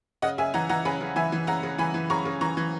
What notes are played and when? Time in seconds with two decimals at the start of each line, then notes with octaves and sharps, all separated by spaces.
0.22 C#3 D#5 F#5
0.38 C#3 E5 G#5
0.54 E3 F#5 A#5
0.69 E3 F#5 A#5
0.85 C#3 G#5 B5
1.01 C#3
1.16 E3 E5 G#5
1.32 E3
1.47 C#3 F#5 A#5
1.63 C#3
1.78 E3 G#5 B5
1.94 E3
2.10 C#3 A#5 C#6
2.25 C#3
2.41 E3 A#5 C#6
2.57 E3